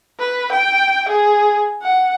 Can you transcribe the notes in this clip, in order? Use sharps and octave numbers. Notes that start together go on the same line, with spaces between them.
B4
G5
G#4
F#5